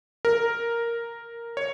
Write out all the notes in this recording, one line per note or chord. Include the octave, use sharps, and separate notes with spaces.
A#4
C#5